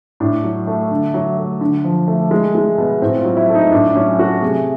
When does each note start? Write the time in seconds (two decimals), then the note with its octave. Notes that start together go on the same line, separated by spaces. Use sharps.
0.20 A2 D4
0.43 F#3
0.67 A3
0.91 D3
1.14 F#3
1.37 A3
1.61 D3
1.84 F3
2.08 A3
2.31 G#3
2.55 G#3
2.78 B2
3.02 A2 C4
3.19 F4
3.25 F#3
3.37 E4
3.49 A3
3.55 D#4
3.72 A2 D4
3.89 D4
3.95 F#3 C#4
4.19 A3 F#4
4.42 C3 G#4